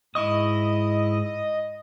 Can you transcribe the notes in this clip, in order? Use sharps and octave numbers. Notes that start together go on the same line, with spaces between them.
G#2 E4 D#5 C#6 D#6